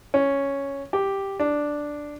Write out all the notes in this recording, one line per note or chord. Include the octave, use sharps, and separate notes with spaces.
C#4
G4
D4